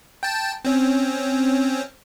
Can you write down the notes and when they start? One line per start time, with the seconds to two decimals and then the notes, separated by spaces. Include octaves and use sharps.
0.23 G5 A5
0.65 C4 C#4